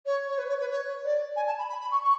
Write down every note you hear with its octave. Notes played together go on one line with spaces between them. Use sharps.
C#5
C#5
B4
C#5
B4
C#5
D5
G#5
A5
B5
B5
B5
C#6
C#6